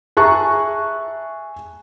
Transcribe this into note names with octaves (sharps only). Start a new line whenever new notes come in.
G#4 E5 A5 A#5 C#6 F#6